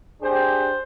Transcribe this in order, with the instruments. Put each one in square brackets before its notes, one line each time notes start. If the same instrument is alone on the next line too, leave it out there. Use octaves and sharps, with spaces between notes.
[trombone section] D4 G4 G#4 [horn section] C5